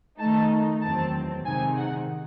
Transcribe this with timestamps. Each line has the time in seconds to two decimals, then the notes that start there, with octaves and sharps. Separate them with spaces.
0.19 D#3 A3 D#4 A5
0.81 E2 D#3 F#3 C4 A5
1.45 C3 D#3 G#3 C4 D#4 G#5
1.77 F#5